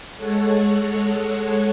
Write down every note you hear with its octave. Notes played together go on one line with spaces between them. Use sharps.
G#3 A4 C#5 F#5